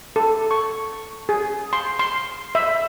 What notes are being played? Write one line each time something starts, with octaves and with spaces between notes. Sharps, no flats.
A4
C#6
G#4
C6
C6
E5